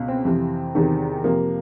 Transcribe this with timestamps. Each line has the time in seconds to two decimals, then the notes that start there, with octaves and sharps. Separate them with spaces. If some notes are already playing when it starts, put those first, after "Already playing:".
Already playing: C#2 B2
0.08 C4
0.25 F2 C3 E3
0.75 E2 C3 D#3
1.24 F2 C3 F3 A#3